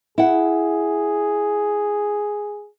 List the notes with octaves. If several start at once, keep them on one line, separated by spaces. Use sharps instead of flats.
E4 G#4 F#5